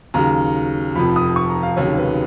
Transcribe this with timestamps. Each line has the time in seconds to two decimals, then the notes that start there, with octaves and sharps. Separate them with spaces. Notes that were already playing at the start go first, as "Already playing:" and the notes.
0.14 D#2 C#3 F#3 A#5
0.95 F1 F2 F3 B5
1.16 D#6
1.36 C#6
1.50 A#5
1.63 F5
1.76 F1 D#2 C#3 F#3 C#5
1.97 B4